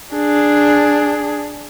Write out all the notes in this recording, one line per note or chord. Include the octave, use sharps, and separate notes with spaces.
D4 G#4